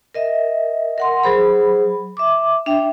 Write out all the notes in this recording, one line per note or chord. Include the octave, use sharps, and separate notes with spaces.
A#4 D#5 E5
A#4 F#5 C6
F#3 G#4 C5 B5
E5 D6
D4 E5 G5